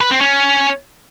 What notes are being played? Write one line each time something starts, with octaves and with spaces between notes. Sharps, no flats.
B4
C4
C#4